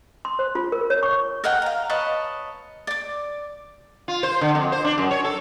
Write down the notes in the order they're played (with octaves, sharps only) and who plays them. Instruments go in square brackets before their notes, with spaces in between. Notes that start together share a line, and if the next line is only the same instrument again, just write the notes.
[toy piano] C6
C5
F4
A#4
C#5
C#6
[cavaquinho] A#4 D#5 F#5 G5
F5 A#5
B4 C#5 D#5 A5
D5 D6
[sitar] F4
C5
D3
F2
C5
D4
F#2
C#5
A4